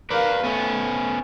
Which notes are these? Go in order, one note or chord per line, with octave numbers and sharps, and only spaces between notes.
A#4 B4 D5 F5
A3 B3 C#4